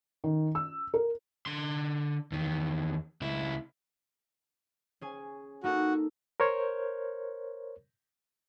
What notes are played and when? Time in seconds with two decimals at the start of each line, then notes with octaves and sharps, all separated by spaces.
0.24 D#3
0.55 E6
0.94 A#4
1.46 D3 C6
2.32 E2 D#3
3.21 C#2 E4
5.01 C#4 G#4 G#5
5.64 A#3 D#4 F#4 A4
6.40 A#4 C5 C#5